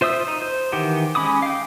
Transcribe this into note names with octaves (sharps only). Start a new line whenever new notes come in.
F4 C5 E5 D#6 E6
D#4
C5
D#3 E3 G4 F#5
G#3 C#4 B5 D6 D#6
F5 G5